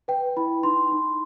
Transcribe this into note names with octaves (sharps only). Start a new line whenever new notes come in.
B4 G5
E4 B5
D#4 C6
D#4